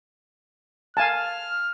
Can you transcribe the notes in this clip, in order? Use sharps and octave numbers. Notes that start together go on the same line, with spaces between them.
F5 G#5 A5 F6